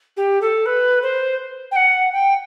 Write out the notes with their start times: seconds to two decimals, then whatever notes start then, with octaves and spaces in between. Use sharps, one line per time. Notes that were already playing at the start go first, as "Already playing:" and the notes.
0.16 G4
0.41 A4
0.65 B4
1.02 C5
1.71 G5
1.75 F#5
2.12 G5